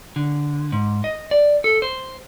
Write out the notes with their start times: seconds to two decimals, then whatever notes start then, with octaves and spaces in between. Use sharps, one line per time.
0.16 D3
0.72 G#2
1.04 D#5
1.31 D5
1.64 A4
1.82 C5